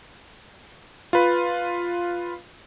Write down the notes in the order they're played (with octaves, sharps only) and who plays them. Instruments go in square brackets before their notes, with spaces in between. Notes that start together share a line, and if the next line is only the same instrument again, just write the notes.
[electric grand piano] F4 B4